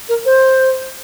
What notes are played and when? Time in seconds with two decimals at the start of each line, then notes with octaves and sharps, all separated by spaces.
0.09 A#4
0.26 C5